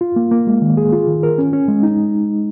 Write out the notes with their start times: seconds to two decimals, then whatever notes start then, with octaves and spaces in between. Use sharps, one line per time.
0.01 F4
0.16 A#3
0.31 A#3
0.47 G#3
0.62 D#3
0.77 G#4
0.92 F4
1.07 D#3
1.23 A#4
1.38 C#4
1.53 C#4
1.68 G#3
1.83 D#4